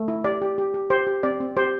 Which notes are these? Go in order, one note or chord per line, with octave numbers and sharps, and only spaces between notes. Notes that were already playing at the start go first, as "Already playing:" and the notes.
Already playing: A3
E4
G4 D5
G4
G4
G4
G4 C5
G4
C4 D5
C4
G4 C5